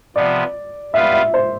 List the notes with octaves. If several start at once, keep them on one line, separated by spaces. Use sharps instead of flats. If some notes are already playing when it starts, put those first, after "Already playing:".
C3 F3 B3 D5
G3 B3 F4 B4 E5 F5
E5
C5